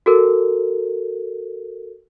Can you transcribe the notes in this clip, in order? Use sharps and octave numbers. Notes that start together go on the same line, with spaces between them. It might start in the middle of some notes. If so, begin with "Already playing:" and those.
F#4 A4 A#4